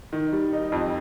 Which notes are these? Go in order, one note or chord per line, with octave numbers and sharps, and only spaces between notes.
D#3
G3
D#4
F2